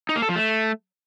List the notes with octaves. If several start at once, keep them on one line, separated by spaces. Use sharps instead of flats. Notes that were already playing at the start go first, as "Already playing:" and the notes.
D#4
A#3
A4
F3
A3